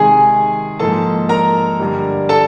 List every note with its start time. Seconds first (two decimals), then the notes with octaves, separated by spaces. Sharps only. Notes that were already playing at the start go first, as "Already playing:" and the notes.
Already playing: C3 D#3 G#3 G#4 G#5
0.79 G#2 F3 A#3 A4 A5
1.29 A#4 A#5
1.80 G2 D3 G3
2.29 A4 A5